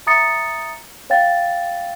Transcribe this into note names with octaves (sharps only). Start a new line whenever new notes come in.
E5 A#5 D#6 A6 C#7
C#5 F5 G5 A6